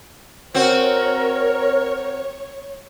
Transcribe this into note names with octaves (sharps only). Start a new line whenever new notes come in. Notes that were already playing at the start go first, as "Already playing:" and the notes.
C4 F#4 A#4 C#5